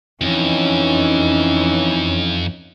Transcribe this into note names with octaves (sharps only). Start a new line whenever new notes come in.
F2 E3 C#4 D#4